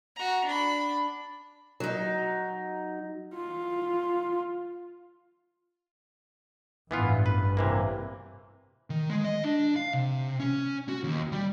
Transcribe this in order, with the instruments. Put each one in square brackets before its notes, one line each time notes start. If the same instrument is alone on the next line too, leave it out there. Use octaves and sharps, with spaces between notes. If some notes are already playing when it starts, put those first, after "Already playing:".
[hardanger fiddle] F#4 A#5
D4 B5
[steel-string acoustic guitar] F#3 D#4
[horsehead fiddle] F4
[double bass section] A1 G2 [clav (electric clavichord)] E3 B3 F4
[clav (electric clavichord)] B4
C3 E3 A#3
[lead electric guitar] D#3
G#3
D#5
D4
F5
C3
C#4
F#4
D#2
G3